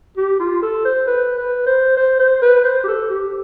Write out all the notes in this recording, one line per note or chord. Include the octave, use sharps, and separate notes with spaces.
G4
F4
A4
C5
B4
B4
C5
C5
C5
B4
C5
G4
A4
G4